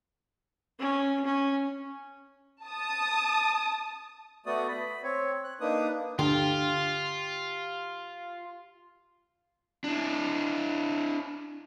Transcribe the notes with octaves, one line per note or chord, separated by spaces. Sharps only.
C#4
C#4
A5 D#6
A3 B3 F#4 D5 D#6
B5
C4 C#5
F#6
A#3 D4 D#4 B4 D#6
D3 F4 G4
D4 E4